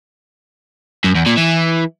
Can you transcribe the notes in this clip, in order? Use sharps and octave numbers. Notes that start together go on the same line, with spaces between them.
F#2
E2
A#2
E3